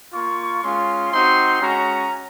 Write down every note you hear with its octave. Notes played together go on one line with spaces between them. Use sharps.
A#3 F4 C#6
G#3 C#4 F4 C6
C4 D#4 F#4 C6
G#3 C#4 F#4 A#5